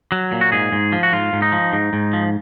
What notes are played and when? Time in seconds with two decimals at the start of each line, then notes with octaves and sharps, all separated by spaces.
0.12 F#3
0.32 A#2
0.41 F#4
0.52 G#2 G#4
0.72 G#2
0.92 F3
1.03 F#4
1.13 G#2 F4
1.33 G#2
1.42 D#4
1.52 F3
1.73 G#2
1.93 G#2
2.13 F3